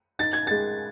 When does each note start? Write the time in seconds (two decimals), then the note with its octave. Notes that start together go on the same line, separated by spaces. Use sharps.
0.19 D#4 A6
0.33 G#6
0.47 G#3 A6